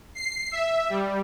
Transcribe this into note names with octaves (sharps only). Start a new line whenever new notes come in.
C7
E5
G3